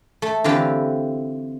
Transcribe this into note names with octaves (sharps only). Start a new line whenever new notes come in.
A3
D3 E3 C4 F4 G4 B4